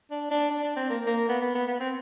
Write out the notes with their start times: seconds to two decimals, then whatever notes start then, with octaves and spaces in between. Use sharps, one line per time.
0.11 D4
0.31 D4
0.50 D4
0.64 D4
0.76 C4
0.90 A#3
1.06 A#3
1.29 B3
1.41 B3
1.55 B3
1.67 B3
1.80 C4